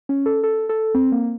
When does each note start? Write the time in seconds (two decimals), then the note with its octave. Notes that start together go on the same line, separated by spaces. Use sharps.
0.09 C#4
0.26 A4
0.44 A4
0.69 A4
0.95 C4
1.12 A#3